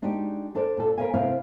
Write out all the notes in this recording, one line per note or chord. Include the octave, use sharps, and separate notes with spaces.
G#3 D4 D#4 F#4 G4
D4 A4 C5 D5
A#2 G#4 A4
A#4 B4 C#5 D#5 F5 G#5
C3 C4 E4 B4 F5